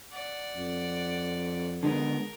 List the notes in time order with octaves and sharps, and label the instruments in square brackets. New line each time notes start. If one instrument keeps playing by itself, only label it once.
[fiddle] D5 F#5
[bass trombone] F2
[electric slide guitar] D3 G#3 B3 [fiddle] A#4